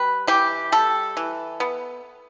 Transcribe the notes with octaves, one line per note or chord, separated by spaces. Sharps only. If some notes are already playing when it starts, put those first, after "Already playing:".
Already playing: G3 B4
E3 G4
G3 A4
E3
B3